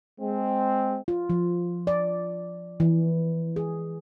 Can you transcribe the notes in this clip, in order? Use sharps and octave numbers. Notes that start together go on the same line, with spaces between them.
G#3 C4
F4
F3
D5
E3
G#4